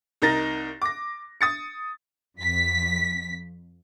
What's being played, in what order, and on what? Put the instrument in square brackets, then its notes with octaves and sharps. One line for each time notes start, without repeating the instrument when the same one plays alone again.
[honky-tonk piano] C2 D#4 A#4 A6 A#6
D6 A#6
D#6 A6 C#7
[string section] F2 B6